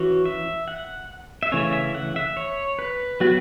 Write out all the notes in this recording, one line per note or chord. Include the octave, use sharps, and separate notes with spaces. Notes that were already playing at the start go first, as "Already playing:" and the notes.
Already playing: E3 C#4 F#4
E5
F#5
E5
C#3 E3 A3 C#4 C#5
E5
F#5
E5
C#5
B4
F#3 B3 F#4